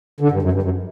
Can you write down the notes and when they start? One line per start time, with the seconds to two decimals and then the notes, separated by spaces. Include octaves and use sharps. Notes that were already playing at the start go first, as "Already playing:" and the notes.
0.20 D3
0.31 G2
0.42 F#2
0.52 G2
0.63 F#2